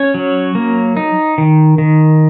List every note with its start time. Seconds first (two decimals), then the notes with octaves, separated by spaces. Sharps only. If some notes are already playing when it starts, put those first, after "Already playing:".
Already playing: C#4 C#5
0.14 F#3
0.55 A#3
0.97 D#4
1.38 D#3
1.78 D#3